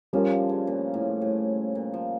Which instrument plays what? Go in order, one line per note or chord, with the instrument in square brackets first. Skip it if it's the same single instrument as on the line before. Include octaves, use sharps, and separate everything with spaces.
[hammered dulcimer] F3 [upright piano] G3 C#4 F4 A#4
[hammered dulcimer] D3
C#3
A#2
A2
A2
A#2
F3